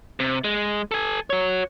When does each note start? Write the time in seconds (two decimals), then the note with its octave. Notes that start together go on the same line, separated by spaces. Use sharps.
0.20 C3
0.44 G#3
0.91 A4 G#5
1.30 F#4 C#5